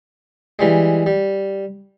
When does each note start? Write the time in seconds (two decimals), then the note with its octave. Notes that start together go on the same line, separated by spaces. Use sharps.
0.59 E3 G3 G#3
1.06 G3